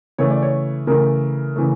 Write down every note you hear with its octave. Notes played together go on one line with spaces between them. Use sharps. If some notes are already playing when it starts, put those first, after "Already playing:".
C#3 E3 A3 C#5
D5
C#5
C#3 E3 A3 A#4
C#3 E3 A3